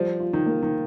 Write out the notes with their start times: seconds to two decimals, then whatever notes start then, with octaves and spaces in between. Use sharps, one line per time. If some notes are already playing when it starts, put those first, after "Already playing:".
Already playing: F3 G3
0.20 F4
0.33 D#3
0.46 A#3
0.62 D#3